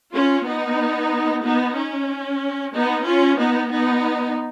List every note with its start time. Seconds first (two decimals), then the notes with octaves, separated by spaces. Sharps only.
0.13 C#4 F4
0.46 B3 D#4
1.44 B3 D#4
1.76 C#4
2.74 B3 D#4
3.06 C#4 F4
3.39 B3 D#4
3.71 B3 D#4